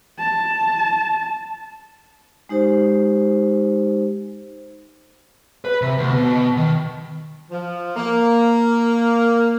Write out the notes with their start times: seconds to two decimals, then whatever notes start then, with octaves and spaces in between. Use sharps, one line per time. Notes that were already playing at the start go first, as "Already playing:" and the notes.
0.19 A5
2.49 G#3 D#4 G4 C5
5.65 B4
5.82 C3
5.98 D2
6.12 B2
6.25 B2
6.57 D#3
7.51 F3
7.96 A#3